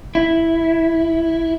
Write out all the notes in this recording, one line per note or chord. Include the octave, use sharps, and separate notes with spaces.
E4